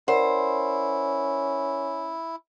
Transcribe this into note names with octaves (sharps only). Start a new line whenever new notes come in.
C#4 E4 A#4 C5 D5 F#5